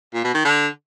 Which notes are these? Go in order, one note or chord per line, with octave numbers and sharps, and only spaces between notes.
A#2
B2
D#3
D3